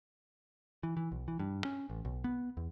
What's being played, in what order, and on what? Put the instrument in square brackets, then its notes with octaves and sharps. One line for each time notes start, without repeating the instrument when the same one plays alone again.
[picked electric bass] E3
E3
B1
E3
G2
C#4
A1
B1
B3
E2